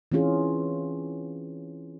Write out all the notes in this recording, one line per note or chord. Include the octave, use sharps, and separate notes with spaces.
E3 C4 C#4 F4 G#4